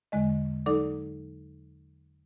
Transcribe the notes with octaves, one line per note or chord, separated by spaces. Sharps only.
E2 D3 G#3 D#5
F#3 D#4 A4 D5 D6